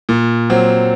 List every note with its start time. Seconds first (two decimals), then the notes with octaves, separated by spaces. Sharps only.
0.09 A#2
0.50 F#3 C4